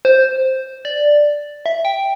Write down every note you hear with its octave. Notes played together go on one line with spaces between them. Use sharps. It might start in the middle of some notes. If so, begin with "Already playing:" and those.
C5
D5
E5
G5